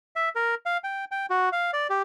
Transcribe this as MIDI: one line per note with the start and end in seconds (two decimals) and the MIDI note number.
0.16 0.29 76
0.35 0.55 70
0.66 0.77 77
0.84 1.05 79
1.11 1.26 79
1.30 1.49 66
1.52 1.71 77
1.73 1.87 74
1.90 2.02 67